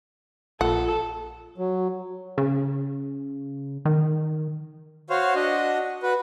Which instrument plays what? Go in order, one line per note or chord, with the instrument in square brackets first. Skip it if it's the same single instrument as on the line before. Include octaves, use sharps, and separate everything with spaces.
[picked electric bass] A#1 [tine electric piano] F4 [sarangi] A4 [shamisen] F#5
[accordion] F#3
[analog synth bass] C#3
D#3
[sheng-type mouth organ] F#4 C5 C#5 F5
D4 F#4 D#5
F#4 B4